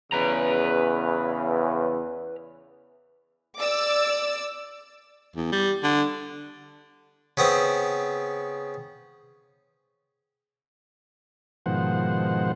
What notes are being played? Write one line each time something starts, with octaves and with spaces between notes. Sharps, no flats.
E2 C#3 B4 A#5
D5 D6 E6
E2
G3
D3
C#3 B3 C4
G#2 B2 D#3 F3 C5 F#5